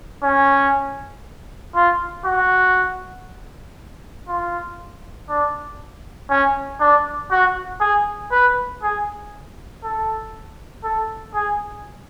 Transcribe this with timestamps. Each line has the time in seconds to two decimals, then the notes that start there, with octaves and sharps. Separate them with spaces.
0.23 C#4
1.75 F4
2.25 F#4
4.28 F4
5.29 D4
6.29 C#4
6.80 D4
7.31 F#4
7.80 G#4
8.31 B4
8.83 G#4
9.83 A4
10.84 A4
11.34 G#4